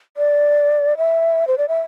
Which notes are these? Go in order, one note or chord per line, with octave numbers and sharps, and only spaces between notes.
D5
E5
C5
D5
E5